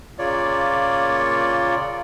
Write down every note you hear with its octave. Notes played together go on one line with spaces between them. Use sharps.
A#2 C#3 A#3 F4 C#5 D5